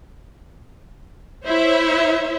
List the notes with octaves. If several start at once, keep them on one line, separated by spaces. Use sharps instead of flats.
E4 C5 C#5 E5